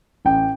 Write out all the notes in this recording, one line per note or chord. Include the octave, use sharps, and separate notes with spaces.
A1 G5